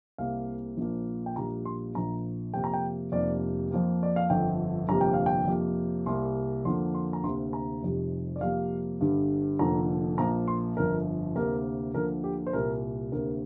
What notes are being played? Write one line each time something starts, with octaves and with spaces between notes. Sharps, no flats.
C2 C3 A#3 F5
A#1 A#2 F3 A#3
G5
A#1 A#2 G3 A#3 A#5
C6
A#1 A#2 F3 A#5
F2 C3 A#3 G5
A#5
G5
F1 F2 C3 G3 A#3 D5
F2 F3 A#3
D5
F5
G1 F2 D3 G5
G1 F2 C3 G3 A#3 A#5
G5
F5
G5
F2 C3 A#3
C2 C3 G3 A#3 C6
F2 D3 F3 A#3 C6
C6
A#5
D2 C3 A#3 C6
A#5
F1 F2 C3 G3
D5
F2 C3 G3 A#3 F5
G1 G2 D3 G3
F1 F2 D3 F3 A#3 A#5
A#1 A#2 F3 A#3 A#5
C6
G1 F2 F3 A#4
D2 C3 A#3 A#4
D2 D3 F3 A#3 A#4
G4
C5
C2 A#2 G3 A#3 A#4
D2 C3 A#3 A#4